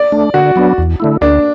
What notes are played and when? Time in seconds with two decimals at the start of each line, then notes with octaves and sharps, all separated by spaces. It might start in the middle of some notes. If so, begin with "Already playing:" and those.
Already playing: D5
0.12 A3 D4
0.34 D3 F#4
0.56 F#3 B3 D4
0.78 E2
1.00 D3 A3 E4
1.21 D2 D4